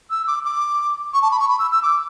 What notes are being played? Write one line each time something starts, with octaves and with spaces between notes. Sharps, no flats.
E6
D6
D6
C#6
A5
B5
C#6
B5
E6
E6
D6